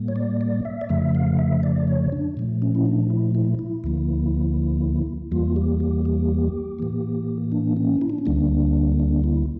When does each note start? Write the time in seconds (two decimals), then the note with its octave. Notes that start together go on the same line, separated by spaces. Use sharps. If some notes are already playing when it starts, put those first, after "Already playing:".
Already playing: A2 G3 A#3
0.08 C#5
0.16 D5
0.41 D5
0.65 E5
0.81 D5
0.89 F2 C#3 F3 A3 E5
1.15 F5
1.39 E5
1.63 D5
1.87 C#5
2.12 D4
2.37 A#2 F3 A3
2.62 C#4
2.75 E4
2.85 D4
3.10 E4
3.35 E4
3.59 E4
3.84 D2 D3 F3 A#3
5.31 E2 E3 G3 A#3 F4
5.56 G4
5.80 G4
6.05 G4
6.79 A2 E3 A#3
7.52 D4
7.76 C#4
8.01 E4
8.10 D4
8.18 C#4
8.26 D2 D3 G3 A#3 D4
8.99 D4
9.24 E4